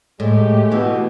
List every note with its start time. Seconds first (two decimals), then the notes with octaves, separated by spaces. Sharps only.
0.20 A2 G#3 A3 G4
0.72 B2 E3